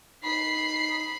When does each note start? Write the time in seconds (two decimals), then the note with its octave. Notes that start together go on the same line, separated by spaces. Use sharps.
0.24 D#4 B5 C7